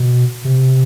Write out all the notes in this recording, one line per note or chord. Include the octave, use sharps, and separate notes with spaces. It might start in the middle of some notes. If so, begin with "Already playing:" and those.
Already playing: B2
C3